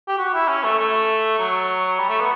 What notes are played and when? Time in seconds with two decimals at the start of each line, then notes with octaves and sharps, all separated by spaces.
0.08 G4
0.18 F#4
0.34 E4
0.48 C#4
0.63 A3
0.79 A3
1.39 F#3
1.99 G3
2.09 A3
2.20 B3